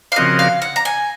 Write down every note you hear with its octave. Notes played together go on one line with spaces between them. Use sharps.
F5
C#3 F3 C4 F#4 A#4 D#5
F5
F#5
A#5
G#5